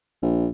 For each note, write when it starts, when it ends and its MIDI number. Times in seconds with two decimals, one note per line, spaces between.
0.22 0.48 34